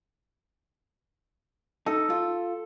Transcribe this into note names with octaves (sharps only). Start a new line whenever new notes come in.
D#4 A4
F4